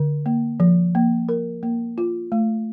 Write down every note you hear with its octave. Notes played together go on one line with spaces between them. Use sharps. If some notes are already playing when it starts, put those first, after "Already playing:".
Already playing: D3
A#3
F3
A#3
A#4
A#3
F4
A3